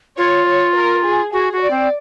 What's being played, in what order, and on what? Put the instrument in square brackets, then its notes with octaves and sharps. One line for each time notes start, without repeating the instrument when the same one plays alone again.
[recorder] F4 [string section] C#5
[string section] C#5
A#4
G#4
[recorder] F#4 [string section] G#4
[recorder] F#4
[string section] D5
[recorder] C4